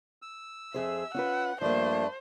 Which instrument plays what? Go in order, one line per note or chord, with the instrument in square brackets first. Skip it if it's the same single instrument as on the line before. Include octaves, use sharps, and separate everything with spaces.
[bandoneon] E6
[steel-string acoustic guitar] F2 G#4 C5 [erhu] E5
[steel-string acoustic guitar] C#4 F4 B4 [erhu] F#5
[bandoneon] G2 A3 D4 [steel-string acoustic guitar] F3 A#3 [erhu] C5